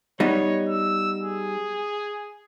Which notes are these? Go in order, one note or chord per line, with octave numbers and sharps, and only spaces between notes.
G3 B3 D#4 C#5
E6
G#4